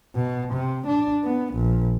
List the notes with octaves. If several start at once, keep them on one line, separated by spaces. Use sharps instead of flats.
B2
C3
D4
B3
A#1